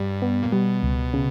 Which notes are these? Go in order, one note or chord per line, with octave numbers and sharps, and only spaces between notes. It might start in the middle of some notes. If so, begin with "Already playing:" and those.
Already playing: G2 G3
B3
A#2
B2 G3
C#2
C#3